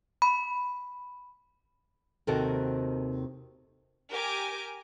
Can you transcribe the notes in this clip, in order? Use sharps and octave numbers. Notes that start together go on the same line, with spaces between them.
B5
D#2 C3 D#3 F#4 A4 A#4
G4 A#4 G#5 D6